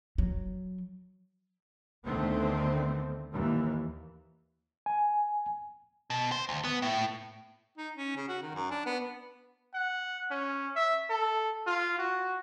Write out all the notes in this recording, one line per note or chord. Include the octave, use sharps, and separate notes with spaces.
F#3
D2 D3 D#3 A3 B3 C4
D#2 E3
G#5
B2
C5
D2
B3
A2
D#4
C#4
C#3
F#4
D#3
F#2
D4
B3
F#5
C#4
E5
A4
F4
F#4